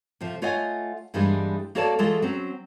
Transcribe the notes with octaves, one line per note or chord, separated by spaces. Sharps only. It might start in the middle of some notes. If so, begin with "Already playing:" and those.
A2 C3 F3
A3 F4 C#5 D#5 F#5 G#5
G2 E3 G3 G#3 A#3 D4
A#3 F#4 A4 C#5 D5 A5
E3 F#3 G#3 F4 A4
F#3 C4 C#4